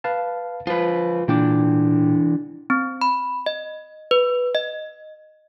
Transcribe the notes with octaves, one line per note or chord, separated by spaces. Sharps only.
B4 F5 A5
F3 F4 B4
A#2 E3 D4 G5 D6
C4
B5
D#5
B4
D#5